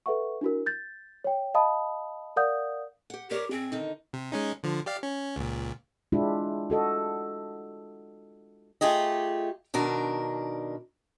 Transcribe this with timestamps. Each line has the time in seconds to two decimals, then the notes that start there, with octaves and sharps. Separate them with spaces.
0.06 A4 B4 E5 F#5 C#6
0.41 D4 E4 F#4 A#4
0.66 G6 A6
1.24 C#5 G5
1.55 D#5 F5 A5 B5 D#6
2.36 A#4 D5 F5 F#5 D#6 G6
3.10 G4 F#5
3.31 G4 A#4 C#5 D5
3.51 G#2 C4 G#4
3.72 D3 D#3 D#4
4.13 C3
4.32 G#3 C#4 D#4
4.63 D3 F3
4.86 G4 D5 F5
5.03 C#4
5.36 C#2 A#2
6.12 G#3 D4 E4 F4 G4
6.70 F#4 A4 D#5
8.81 A3 F4 G4 G#4 D#5
9.74 B2 D#3 D4 A#4